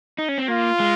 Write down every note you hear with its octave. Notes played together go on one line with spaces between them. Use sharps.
D#4
C#4
C4
A#3 F4
G#3